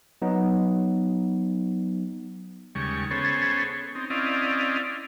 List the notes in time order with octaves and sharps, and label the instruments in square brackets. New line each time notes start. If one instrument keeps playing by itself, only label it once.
[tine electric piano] F#3 B3 D#4
[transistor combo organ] D#2 C#3 G3 G#3 C#6
B3 C#4 G#4 A4 C5 C#5
C4 D#4
C4 C#4 E4 D5 D#5 F5